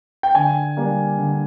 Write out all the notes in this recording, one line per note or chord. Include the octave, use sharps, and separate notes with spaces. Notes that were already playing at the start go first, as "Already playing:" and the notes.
G5
D3 G#5
G3 A#3 D4
D3